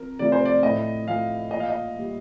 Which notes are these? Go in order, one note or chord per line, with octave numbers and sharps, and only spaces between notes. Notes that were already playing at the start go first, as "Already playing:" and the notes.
Already playing: F2 A#4
C3 F3 A3 D5
C5
D5
A2 D#5
F3 A3 F5
A#2 D#5
F5
D#5
G3 A#3